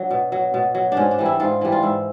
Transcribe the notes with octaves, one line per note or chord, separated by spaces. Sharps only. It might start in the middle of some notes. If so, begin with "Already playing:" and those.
Already playing: F#3 D4
B2
F#3
B2
F#3
D4
G#2 C#4
D4
E3 G3
E4
G#2 F4
E3 G3
F4
G#2 E4